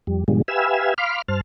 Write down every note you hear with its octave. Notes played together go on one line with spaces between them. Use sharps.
F2 G3
G#2 B2 D3 F3 G3 G#3
G4 B4 E5 F5 G#5 E6
F5 B5 C6 D6 F6
G2 C5 A5 F6